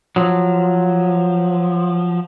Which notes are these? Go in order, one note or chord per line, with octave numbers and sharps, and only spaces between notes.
F3 F#3